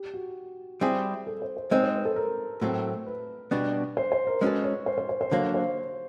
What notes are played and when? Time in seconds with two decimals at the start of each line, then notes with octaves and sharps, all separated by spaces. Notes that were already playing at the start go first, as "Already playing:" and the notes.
Already playing: G4
0.14 F#4
0.81 G3 C4 E4 G#4
1.27 A4
1.42 C5
1.57 C5
1.71 G#3 C4 D#4 C5
1.83 C5
1.94 B4
2.05 A4
2.16 A#4
2.61 A2 F#3 A3 C4
3.06 B4
3.51 B2 G3 B3 D4 F#4
3.97 C5
4.12 C5
4.27 A#4
4.41 G#3 C#4 F#4 A4 B4
4.64 C#5
4.86 C5
4.98 C5
5.09 C5
5.21 C5
5.32 D3 F#3 A#3 C#5
5.54 C5